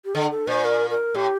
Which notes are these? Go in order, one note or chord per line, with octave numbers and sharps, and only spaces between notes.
G4
D3 A4
A4
A#2 C5
A#4
A#4
A2 G4